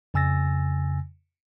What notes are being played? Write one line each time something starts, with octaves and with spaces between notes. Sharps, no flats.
F2 C#3 G#5 E6 A6 A#6